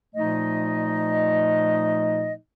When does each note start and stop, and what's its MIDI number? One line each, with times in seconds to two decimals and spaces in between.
0.15 2.34 46
0.15 2.34 53
0.15 2.34 57
0.15 2.34 63
0.15 2.34 75